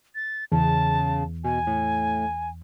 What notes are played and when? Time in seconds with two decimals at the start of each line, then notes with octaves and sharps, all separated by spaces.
0.15 A6
0.52 E2 C#3 A5
1.44 B2 G#5
1.67 A2